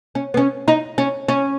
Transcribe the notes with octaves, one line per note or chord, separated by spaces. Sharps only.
C#4
B3
C#4
D#4
C#4
C#4